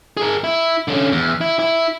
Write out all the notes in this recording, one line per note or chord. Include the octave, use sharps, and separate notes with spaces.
G#4 A#4
E4
D3 C#4
E2
E4
E4